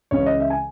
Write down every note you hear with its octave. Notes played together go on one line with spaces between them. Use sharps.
C#2 C#3 E3 C#5
D#5
E5
G#5